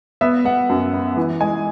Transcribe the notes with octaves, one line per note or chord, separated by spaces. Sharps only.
B3 E5
B3 F#5
F#2
B3
E3
G#3 G#5